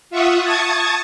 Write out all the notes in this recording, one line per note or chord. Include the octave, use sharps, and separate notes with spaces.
F4 E5 F#5 C#6 D#6
A5 C#6 D#6 G#6 A6